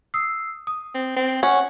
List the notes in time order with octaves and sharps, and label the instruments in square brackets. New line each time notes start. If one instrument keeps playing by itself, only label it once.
[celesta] D#6 E6 C7
D#6
[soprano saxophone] C4
C4
[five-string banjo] C#4 [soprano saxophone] F#5